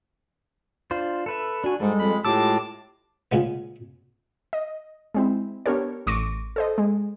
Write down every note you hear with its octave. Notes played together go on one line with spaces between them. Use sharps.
D4 F4 C5
A4 B4 E5
D4 F#4 G#5
G#2 G3 G#3 A4
F2 B5
A2 G#3 F4 G4 A5 D6 E6
A#2 C#3 G#3 B3
D#5
G#3 C4 E4
B3 D4 G4 A#4 C#5
A1 C#6 D6 A#6 D#7
A4 C5 D#5
G#3